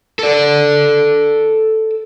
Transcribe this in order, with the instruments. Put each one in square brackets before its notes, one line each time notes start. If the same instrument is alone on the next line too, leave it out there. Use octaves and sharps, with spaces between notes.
[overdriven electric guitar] A4 D5